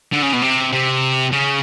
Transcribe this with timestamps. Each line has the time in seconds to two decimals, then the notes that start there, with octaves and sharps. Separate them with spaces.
0.13 D3
0.23 C#3
0.33 B2
0.42 C3
0.73 C3
1.32 C#3